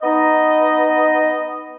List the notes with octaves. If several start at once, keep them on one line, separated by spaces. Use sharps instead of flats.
B3 D#4 D#5